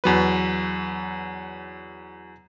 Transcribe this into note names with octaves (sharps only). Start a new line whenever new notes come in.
E2 F#3 B4